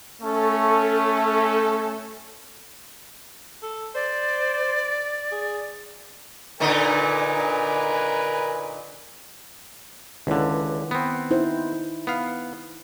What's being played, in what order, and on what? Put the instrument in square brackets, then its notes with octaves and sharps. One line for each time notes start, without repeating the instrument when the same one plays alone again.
[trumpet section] A3 C#4 [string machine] A4
[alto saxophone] A4
[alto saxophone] C5 [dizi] D5
[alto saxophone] G#4
[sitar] A#2 D3 D#4 [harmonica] A#4 B4 G#5
[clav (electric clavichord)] C#2 D3 [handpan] D#3 E4 B4
[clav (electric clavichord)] B3 C4
[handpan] D#4 E4 C5
[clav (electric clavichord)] B3 F5